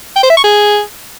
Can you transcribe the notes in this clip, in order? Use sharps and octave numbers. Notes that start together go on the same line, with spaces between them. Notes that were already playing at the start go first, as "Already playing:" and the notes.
G5
C5
E5
C#6
G#4